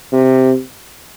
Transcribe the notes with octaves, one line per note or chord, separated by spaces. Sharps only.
C3